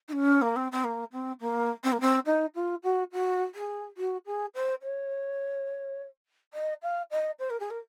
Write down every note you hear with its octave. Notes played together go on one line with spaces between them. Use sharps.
D#4
C#4
A#3
C4
C4
A#3
C4
A#3
C4
A#3
C4
D#4
F4
F#4
F#4
G#4
F#4
G#4
C5
C#5
D#5
F5
D#5
C5
A#4
G#4
A#4